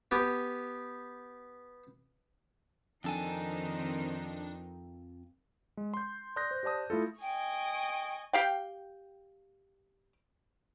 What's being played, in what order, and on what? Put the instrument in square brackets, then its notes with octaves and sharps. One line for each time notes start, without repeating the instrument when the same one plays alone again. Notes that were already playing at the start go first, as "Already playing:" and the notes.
[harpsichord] B3 G4 G#5
[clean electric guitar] F2 A4 G#5 [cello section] D#3 C4 D#4 [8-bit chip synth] D4
[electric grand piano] G#3
C6 G6
D5 C6 D#6 F#6 G6 A#6
C5
G4 C5 D5 A5 D#6
A3 E4 F4 A4
[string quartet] D#5 G#5 C#6 [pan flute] G5
[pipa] G4 F5 G5